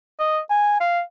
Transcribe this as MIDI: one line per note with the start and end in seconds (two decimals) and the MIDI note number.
0.19 0.39 75
0.50 0.75 80
0.80 1.01 77